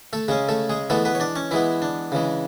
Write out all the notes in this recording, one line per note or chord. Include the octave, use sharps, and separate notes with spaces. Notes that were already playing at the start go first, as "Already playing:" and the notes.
A3 A4
C#3 G#3 C#4 G#4
A3 A4
G#3 G#4
E3 G#3 A3 B3 A4
B3 B4
C#5
D4 D5
C#4 C#5
E3 G#3 B3 E4
D4
C#3 E3 G#3